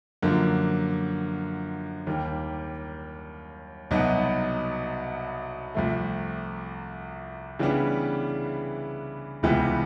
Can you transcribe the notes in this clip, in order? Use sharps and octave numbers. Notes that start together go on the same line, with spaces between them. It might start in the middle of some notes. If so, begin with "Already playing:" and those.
F#2 D3 F3 A#3
D#2 D#3 G3 A#3
C2 B2 F#3 B3 D#4
C2 C3 F3 A3
C#3 E3 G3 B3 D4
C#2 C3 E3 G3 B3